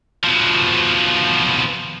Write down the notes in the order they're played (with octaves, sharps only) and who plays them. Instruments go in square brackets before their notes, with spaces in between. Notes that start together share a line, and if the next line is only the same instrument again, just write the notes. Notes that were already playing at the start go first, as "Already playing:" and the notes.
[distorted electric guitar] B2 F3